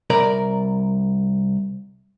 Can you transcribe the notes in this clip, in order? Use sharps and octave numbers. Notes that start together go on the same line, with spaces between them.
C2 A#4 D5